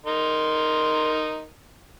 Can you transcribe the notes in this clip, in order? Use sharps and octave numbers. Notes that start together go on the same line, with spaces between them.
D#4 A#4 C6